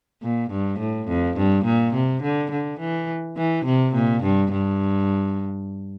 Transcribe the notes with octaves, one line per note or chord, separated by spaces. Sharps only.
A#2
G2
A2
F2
G2
A#2
C3
D3
D3
E3
E3
C3
A#2
G2
G2